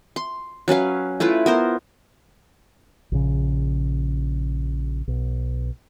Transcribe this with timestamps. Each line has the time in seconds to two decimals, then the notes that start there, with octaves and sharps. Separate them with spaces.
0.16 C6
0.68 F#3 C#4 B4 F5
1.20 A3 E4 F4 B4
1.46 B3 A#4 C5
3.12 A#1 C#3
5.08 B1